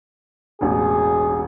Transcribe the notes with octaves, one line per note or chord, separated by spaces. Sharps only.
E1 A1 G#4